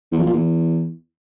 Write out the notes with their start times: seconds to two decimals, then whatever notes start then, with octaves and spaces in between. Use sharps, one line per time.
0.12 E2
0.19 F2
0.26 A#2
0.33 E2